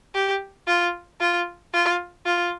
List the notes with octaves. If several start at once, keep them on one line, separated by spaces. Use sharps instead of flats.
G4
F4
F4
F4
F4